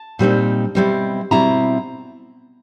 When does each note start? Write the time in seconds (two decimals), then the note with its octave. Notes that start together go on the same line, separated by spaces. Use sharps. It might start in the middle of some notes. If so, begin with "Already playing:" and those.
Already playing: A5
0.19 A#2 G3 C4 D#4
0.75 B2 G3 C4 E4
1.31 B2 G3 C4 E4 A#5